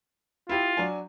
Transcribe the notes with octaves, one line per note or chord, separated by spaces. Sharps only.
E4 F4 G4
F#3 D4 G#5